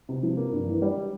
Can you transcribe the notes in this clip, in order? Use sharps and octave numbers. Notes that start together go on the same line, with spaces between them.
C3
F3
A#3
G2
E3
G3